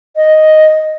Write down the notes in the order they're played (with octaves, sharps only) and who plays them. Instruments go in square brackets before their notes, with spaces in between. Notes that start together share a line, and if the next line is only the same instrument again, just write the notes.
[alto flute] D#5